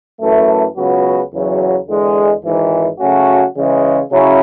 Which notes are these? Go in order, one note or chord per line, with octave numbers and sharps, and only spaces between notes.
F#2 E3 A3
C#2 C#3 F#3 B3 F#4
E2 C#3 F#3
E2 D3 G#3
G#1 G#2 E3
C#3 F#3 A3 C#4 F#4
C#3 E3 G#3
C#3 F#3 C#4 E4